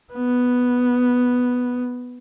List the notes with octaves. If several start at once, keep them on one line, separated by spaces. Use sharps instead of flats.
B3